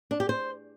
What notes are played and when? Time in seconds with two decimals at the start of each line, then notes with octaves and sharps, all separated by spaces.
0.11 D4
0.20 G4
0.29 C5